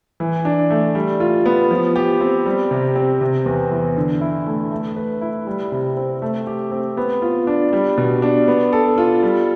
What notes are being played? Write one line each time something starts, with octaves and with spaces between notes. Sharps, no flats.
E3
D4
A3
G3
F4
B3
F3
G4
C4
G3
C3
C4
C3
E2
E3
D3
E4
A3
A3
B4
E4
G3
C3
C4
A3
G4
C4
B3
F4
D4
G3
B2
D4
B3
A4
F4
G3